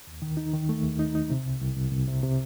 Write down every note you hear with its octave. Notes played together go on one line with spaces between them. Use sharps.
D#2
D#3
D#4
D#3
A3
D#2
D#4
D#4
C3
C2
C2
C2
C2
C3
C3